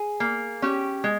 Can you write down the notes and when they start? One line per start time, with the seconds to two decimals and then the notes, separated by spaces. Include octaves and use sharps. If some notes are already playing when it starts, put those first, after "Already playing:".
Already playing: G#4
0.20 A#3
0.62 C#4 G4
1.04 G#3